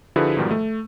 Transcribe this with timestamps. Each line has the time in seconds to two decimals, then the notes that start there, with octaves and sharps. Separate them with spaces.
0.16 D3 F3 E4 F#4 G#4 B4
0.37 G#2 B2 D#3 F3 G3
0.51 A3